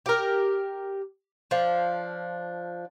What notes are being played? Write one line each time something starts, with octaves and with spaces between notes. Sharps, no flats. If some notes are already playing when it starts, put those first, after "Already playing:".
G4 A#4
F3 D4